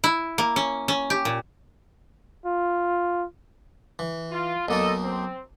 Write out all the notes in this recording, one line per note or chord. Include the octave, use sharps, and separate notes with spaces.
E4
A#3
C#4
C#4
G4
A#2
F4
E3
F4
B1 A#2 A#3 D#4 A4 D#5
C4